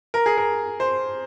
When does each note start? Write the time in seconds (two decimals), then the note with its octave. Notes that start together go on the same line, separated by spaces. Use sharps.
0.14 A#4
0.26 G#4
0.38 A#4
0.80 C5